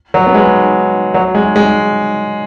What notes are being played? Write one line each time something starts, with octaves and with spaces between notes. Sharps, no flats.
F#3
B3
G#3
F#3
G#3
G#3